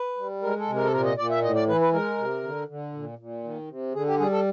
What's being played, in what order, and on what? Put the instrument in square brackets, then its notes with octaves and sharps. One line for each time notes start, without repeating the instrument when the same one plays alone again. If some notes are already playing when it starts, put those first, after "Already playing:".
Already playing: [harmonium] B4
G3
G#3 A#4
A4
C3
A#4
A4
A#2 A#4
D#5
A#2 D5
E5
A2 D#5
D5
E3 B4
B4
G#3 A#4
C3
D3
D3
A#2
A#2
D#3
C3
D3 G#4
G4
G3 G#4
A4